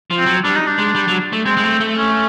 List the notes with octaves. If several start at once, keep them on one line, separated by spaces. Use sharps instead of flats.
F3
C4
F#3
G3 D4
D#4
D4
G#3
G3
F#3
A3
G#3 C4
G#3
A3
A3
C#4